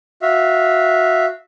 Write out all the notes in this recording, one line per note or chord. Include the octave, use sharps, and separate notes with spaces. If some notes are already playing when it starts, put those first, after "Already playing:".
F#4 E5 F5